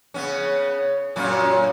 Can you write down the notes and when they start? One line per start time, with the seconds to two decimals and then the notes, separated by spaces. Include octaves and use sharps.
0.14 C#3 B3 C#4
1.16 F#2 A#2 C#4